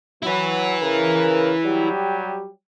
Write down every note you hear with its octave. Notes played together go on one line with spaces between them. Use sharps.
F#3 E4 B4
C#3 A#4
F#3 G3 G4